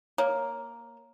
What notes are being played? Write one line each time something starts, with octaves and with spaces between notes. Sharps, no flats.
A#3 C#5